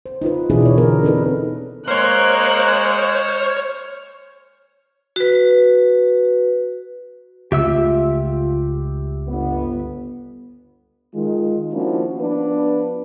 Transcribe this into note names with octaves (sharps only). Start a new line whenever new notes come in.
C5
D#4 F4 B4
B2 E3 D4 E4 G#4
B2 C#5
D3 B3 A#4 C#5 D5
C4 C#4 D#4 A4 B4
G#3 A#3 C5 C#5 F6 F#6
F#4 B4
C#2 C#3 A3 F4 G4 E5 E6
G1 B3
D#3 G#3 F4
F3 A#3 C#4 D4 E4 F#4
F3 B3 D4 B4